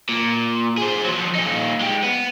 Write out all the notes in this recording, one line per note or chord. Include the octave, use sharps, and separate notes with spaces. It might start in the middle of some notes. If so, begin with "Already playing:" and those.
A#2
G#4 C5
F3 F#3
A#2 D#4
G#3 G4
B3